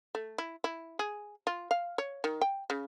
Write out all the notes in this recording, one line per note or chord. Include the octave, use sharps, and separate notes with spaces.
A3
E4
E4
G#4
F4
F5
C#5
D#3
G5
C#3